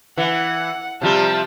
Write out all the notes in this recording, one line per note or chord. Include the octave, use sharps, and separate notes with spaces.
E3 F#5
C3 F3 G3 A5